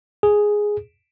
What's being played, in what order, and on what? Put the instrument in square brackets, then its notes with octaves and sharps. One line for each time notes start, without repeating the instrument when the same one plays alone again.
[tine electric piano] G#4